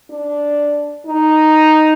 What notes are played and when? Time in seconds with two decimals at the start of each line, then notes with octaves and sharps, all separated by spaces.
0.10 D4
1.07 D#4